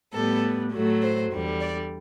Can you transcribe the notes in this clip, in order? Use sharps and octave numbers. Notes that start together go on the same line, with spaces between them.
A2 G3 B3 A4
A2 F#3 A3
C5
E2 D3 G3
D5